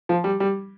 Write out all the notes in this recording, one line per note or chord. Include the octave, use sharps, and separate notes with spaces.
F3
G3
G3